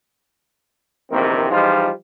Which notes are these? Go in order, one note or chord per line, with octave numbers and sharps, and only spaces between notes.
A#1 E2 C3 D#3 A#3 C4
E3 F3 G3 G#3 D#4 F4